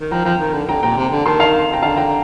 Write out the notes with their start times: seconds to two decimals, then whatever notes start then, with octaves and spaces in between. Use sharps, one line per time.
0.01 D#3
0.11 F3 G5 A#5
0.25 F3 G5 A#5
0.41 D#3
0.54 D3
0.69 D3 G5 A#5
0.83 A#2 G5 A#5
0.97 C3
1.12 D3
1.25 D#3 A5 C6
1.40 F5 A5
1.73 G5 A#5
1.82 D3 F5 A5
1.97 G5 A#5